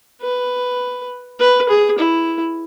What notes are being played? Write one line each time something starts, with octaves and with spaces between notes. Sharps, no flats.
B4
B4
G#4
E4